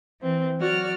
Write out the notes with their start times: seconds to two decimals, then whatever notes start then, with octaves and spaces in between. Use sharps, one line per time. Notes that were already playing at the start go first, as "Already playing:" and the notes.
0.20 E3 C4
0.58 F#3 F#4 D5 F6